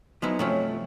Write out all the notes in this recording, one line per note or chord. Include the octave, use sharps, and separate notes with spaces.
F3 F#3 G#3 B3 D#4 E4
G2 C3 F3 F#3 A3 C#4